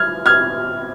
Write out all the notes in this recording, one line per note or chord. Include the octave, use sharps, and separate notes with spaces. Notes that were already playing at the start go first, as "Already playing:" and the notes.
Already playing: F6 G#6
F6 G#6